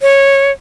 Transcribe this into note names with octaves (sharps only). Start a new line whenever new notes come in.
C#5